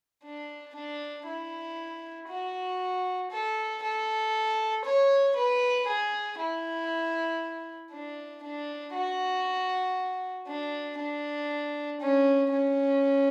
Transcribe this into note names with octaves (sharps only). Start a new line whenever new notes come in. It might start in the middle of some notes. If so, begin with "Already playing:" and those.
D4
D4
E4
F#4
A4
A4
C#5
B4
G#4
E4
D4
D4
F#4
D4
D4
C#4
C#4